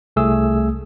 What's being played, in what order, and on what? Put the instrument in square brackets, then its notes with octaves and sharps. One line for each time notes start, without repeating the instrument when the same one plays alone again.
[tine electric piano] C2 A3 G#4 E6